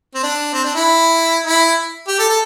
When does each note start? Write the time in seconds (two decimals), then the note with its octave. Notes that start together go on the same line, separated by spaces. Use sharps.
0.14 C4
0.23 D4
0.54 C4
0.64 D4
0.75 E4
1.46 E4
2.08 G4
2.19 A4
2.29 A4